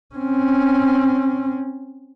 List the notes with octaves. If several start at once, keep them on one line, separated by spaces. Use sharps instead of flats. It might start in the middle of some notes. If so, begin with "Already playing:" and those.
C4 C#4